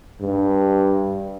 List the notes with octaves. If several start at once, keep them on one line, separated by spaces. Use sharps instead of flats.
G2